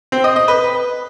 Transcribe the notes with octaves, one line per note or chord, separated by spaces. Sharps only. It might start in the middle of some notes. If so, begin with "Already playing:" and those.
C4
D#5
D#5
B4